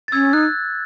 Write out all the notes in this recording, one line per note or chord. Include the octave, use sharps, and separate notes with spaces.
A6
C#4 E6 G#6
D#4 F#6